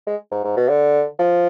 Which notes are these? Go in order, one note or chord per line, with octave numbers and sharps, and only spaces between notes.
G#3
G#2
G#2
B2
D3
F3